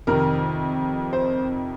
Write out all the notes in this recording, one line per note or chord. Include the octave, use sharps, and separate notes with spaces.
F2 C3 D#3 A#4
C5